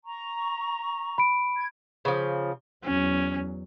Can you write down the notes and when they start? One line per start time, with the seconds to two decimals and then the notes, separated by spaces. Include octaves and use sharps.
0.05 A#5 C#6
1.18 B5 D7
1.56 G#6
2.05 C#3 F3
2.85 E2 F#3 C#4